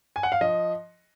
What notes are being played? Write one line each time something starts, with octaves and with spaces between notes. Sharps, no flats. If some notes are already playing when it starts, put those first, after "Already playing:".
G#5
F#5
F5
F3 D#5